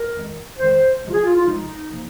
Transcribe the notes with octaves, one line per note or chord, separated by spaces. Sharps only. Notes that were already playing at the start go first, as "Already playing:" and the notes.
Already playing: A#4
F2 D#3 G#3
F2 D#3 G#3 C5
C2 C3 F3 G#3 F4
G#4
F4
F4
C2 C3 F3 G#3 D#4
C3 F3 A#3